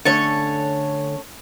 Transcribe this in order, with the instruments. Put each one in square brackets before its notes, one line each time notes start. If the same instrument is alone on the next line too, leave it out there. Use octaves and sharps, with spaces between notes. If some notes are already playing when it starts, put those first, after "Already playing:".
[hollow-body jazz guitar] D3 A3 C#4 [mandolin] A4 C#5